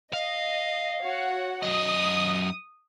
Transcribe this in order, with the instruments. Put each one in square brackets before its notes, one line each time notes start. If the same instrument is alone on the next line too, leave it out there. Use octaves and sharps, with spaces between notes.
[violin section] D#5 [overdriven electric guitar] F5
[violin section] F#4 C#5 F#5
[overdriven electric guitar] F#2 D#5 [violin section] D#6